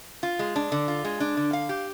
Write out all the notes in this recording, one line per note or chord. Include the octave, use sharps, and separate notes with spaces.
F4
G#3
D4
D3
F4
G#3
D4
D3
F5
G4